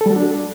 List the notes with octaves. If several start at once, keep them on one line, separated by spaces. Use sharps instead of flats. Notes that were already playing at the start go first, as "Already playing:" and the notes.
A4
G3
F#4
D4